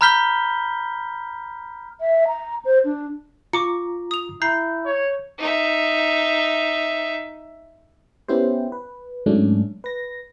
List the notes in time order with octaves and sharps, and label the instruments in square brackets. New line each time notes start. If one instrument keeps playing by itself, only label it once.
[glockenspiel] A#5 B5 F6 G6 B6 G7
[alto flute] E5
A#5
C5
D4
[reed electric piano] F4 A#5 [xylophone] C#6 D6 C#7
[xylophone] D#6 F7
[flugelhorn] E4 [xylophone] A#5 C7 [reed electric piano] G6
[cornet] C#5
[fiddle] D#4 E5
[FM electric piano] B3 C#4 E4 G4 C5
B4
G#2 F#3 A3 C#4 D4
B4 A#6